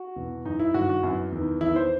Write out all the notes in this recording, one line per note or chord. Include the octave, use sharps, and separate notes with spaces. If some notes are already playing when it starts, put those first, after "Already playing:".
Already playing: F#4
E2 B2
F#2 E3 D#4
E4
G2 D#3 F#4
F#4
F#2 E3
E2 D#3
E2 D#3 E4
C5